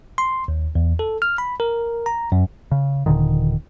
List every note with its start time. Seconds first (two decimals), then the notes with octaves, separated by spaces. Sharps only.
0.18 C6
0.48 D#2
0.75 E2
0.99 A4
1.22 F6
1.38 B5
1.60 A#4
2.06 A#5
2.32 F#2
2.72 C#3
3.06 D#1 A#2 D3 D#3